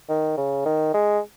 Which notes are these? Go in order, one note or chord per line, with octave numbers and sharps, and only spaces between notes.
D#3
C#3
D#3
G#3